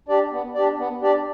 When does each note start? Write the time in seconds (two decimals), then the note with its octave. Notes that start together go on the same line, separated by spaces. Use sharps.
0.08 D4 G4 D5
0.32 B3
0.54 D4 G4 D5
0.78 B3
1.02 D4 G4 D5